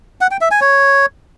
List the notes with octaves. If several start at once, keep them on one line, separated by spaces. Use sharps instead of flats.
F#5
G5
E5
G#5
C#5